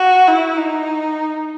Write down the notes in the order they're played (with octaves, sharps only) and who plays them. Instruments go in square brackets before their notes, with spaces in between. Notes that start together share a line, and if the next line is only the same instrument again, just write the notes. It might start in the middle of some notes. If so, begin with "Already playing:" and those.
Already playing: [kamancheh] F#4
E4
D#4